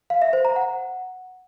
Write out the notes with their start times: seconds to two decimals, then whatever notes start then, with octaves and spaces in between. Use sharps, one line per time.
0.10 F5
0.22 E5
0.33 C5
0.45 A#5
0.56 F#5